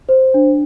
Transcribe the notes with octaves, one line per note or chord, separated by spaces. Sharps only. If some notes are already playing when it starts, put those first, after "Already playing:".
C5
D4